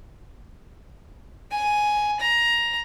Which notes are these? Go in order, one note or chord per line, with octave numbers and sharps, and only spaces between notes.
G#5
A#5